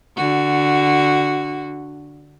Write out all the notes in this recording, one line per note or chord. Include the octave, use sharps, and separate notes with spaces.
D3 F#4